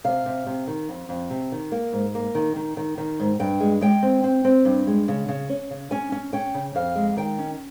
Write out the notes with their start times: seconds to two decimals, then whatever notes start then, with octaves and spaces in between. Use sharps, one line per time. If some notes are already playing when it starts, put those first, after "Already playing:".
0.04 C3 F5
0.26 C3
0.47 C3
0.67 D#3
0.89 F2
1.09 F2
1.30 C3
1.52 D#3
1.72 A#3
1.93 G#2
2.15 A#3
2.35 D#3
2.56 D#3
2.77 D#3
2.98 D#3
3.20 G#2
3.40 G2 G5
3.60 G#3
3.81 G#3 G5
4.03 C4
4.24 C4
4.45 C4
4.65 G2
4.87 G#3
5.08 C#3
5.28 C#3
5.49 C#4
5.70 C#3
5.91 C#4 G#5
6.12 C#4
6.33 C#4 G5
6.54 C#3
6.75 F2 F5
6.96 G#3
7.16 D#3 G5
7.39 C#4